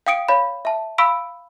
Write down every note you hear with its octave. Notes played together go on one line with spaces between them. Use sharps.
F5 G5 D#6 C#7 D7
C#5 F5 B5
E5 A5
F5 B5 C#6 E6 B6 D7